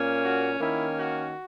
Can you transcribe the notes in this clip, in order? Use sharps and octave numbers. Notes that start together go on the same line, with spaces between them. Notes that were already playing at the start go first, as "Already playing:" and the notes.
Already playing: A#2 A#3 C#4
F#4
D#3 A#3 C#4 E4
F#4